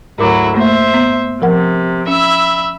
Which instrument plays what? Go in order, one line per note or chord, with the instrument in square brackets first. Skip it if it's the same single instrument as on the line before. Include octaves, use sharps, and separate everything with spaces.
[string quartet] D2 F#3 E4 [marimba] G#2 A#4 D6
[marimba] A3 A#3 [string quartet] C5 E5
[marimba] B3
[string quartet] C3 [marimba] F3 A#4 F#5
[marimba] C#4 [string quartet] E5 B5 E6